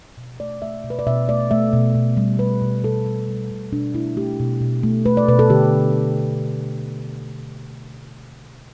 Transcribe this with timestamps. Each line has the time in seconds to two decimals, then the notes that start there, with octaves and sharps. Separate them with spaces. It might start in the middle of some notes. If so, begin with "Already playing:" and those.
0.17 B2
0.40 A3 D5
0.62 A3 E5
0.84 B2
0.90 B4
0.99 D5
1.07 B2 E5
1.28 A3 D5
1.51 A3 E5
1.73 B2
1.95 B2
2.17 G3
2.39 G3 B4
2.62 B2
2.84 B2 A4
3.06 G3
3.28 G3
3.51 B2
3.72 B2 D4
3.95 A3 E4
4.17 A3 G4
4.40 B2
4.61 B2
4.83 A3
5.06 A3 B4
5.17 D5
5.28 B2 B4
5.39 A4
5.50 D3 G4